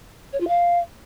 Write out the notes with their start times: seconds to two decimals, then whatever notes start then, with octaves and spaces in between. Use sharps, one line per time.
0.32 C#5
0.40 F4
0.48 F5